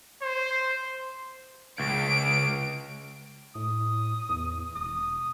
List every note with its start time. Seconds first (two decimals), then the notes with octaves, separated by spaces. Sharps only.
0.22 C5
1.80 C#2 D7
3.55 A2 D#6
4.29 E2
4.76 E1 D#6